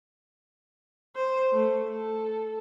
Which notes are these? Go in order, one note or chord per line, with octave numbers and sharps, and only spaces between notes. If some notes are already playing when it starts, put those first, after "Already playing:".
C5
A3
A4